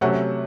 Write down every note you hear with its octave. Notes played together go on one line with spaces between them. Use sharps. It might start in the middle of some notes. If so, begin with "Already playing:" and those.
C3 F#3 A3 C#4 F#5